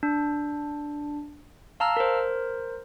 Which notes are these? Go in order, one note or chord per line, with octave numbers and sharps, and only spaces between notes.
D4
F5 A5 A#5 E6 F6
A#4 C5